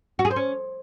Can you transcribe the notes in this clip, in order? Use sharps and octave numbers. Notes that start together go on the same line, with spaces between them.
F#4
G#4
C5
C#4